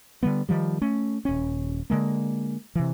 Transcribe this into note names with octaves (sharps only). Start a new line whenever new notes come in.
D3 G3 B3
D#3 F3 G3
A3 C#4
D#1 C#4
D3 G#3 A#3
C3 E3